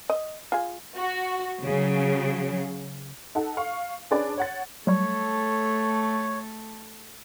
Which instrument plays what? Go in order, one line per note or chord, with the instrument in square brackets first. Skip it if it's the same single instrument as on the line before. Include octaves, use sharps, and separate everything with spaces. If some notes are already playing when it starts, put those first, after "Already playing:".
[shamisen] D#5
F4 G#4
[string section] F#4
C#3 F#3
[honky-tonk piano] D#4 A4 F#5
F5 C#6
C#4 D4 G#4 B4 D5
C#5 F#5 A6
[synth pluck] F#3 G3 [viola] A3 A4 [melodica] C#5